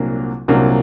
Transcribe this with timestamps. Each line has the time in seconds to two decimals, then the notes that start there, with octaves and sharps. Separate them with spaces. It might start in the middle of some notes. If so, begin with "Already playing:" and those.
Already playing: C2 A#2 F#3 A#3 D4
0.48 C2 A#2 F#3 A#3 D4